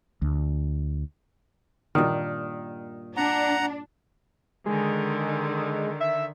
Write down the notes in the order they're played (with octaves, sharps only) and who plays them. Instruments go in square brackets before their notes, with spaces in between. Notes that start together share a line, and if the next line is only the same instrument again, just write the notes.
[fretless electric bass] D2
[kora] G2 A#2 [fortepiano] D#3
[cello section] D4 [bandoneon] F#5 A#5
[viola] D3 D#3 [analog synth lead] G#3
[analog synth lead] E5